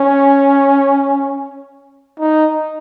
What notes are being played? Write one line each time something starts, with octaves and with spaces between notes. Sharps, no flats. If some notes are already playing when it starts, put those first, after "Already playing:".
Already playing: C#4
D#4